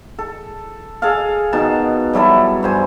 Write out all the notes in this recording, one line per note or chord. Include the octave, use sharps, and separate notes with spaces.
A4
G#4 A4 F5
B2 D#3 A5
F#3 G3 E4 A4
G2 C5 G#5